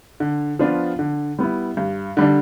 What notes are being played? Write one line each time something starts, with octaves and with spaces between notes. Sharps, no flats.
D3
F3 B3 D4 F4
D3
G3 B3 E4
G2
D3 G3 D4